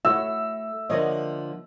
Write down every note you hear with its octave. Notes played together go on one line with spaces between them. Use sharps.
A3 E4 F#4 C#5 E5 E6
D3 F3 A#3 C#5 D#5